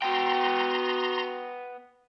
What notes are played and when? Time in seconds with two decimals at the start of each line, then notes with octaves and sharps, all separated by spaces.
0.02 B3 F#4 G5 A#5 C6